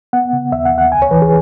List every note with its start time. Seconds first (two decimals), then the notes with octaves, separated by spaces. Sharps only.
0.13 B3 F#5
0.33 C#3
0.52 D#2 E5
0.65 F#5
0.72 D#2
0.78 F#5
0.92 C#2 G#5
1.02 C#5
1.11 E3 B4
1.22 G#4